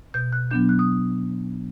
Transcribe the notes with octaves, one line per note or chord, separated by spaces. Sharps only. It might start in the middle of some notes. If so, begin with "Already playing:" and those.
B2 G6
F#6
F#3 B3 D4 G6
F#6
D#6